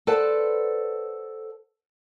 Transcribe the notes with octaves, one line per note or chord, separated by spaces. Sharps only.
A4 B4 C5 D5 F#5 A5